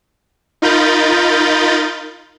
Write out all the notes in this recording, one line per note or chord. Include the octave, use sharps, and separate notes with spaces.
D#4 F4 A#4 B5 G6 A6